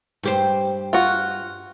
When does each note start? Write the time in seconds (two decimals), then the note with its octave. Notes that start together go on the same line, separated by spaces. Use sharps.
0.23 G2 G4 C5
0.93 F4 F#4